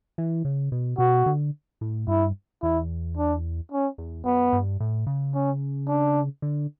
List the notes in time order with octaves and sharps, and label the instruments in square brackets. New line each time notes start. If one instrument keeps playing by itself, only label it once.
[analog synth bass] E3
C#3
B2
[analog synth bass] B2 [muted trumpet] F#4
[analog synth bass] D3
A2
[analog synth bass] G2 [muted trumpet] E4
[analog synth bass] E2 [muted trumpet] E4
[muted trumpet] D4
C#4
[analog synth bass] E2
[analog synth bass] F#2 [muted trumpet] B3
[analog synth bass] G2
A2
C#3
[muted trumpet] C#4
D4
[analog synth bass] D3